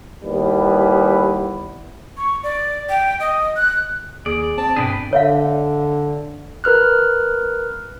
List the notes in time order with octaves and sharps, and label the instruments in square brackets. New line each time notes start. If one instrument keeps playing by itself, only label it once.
[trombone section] D#2 G3 B3 E4 B4
[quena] C#6
D5
G5
D#5
F#6
[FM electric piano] D#2 [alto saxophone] G#4 [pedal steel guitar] D5
[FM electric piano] C4 [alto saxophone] A5
[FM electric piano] G1 B2 [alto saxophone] D4 [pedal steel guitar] G#4 B4 G5
[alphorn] D3 [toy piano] C#5 E5 F5
[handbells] A#4 B4 F6 F#6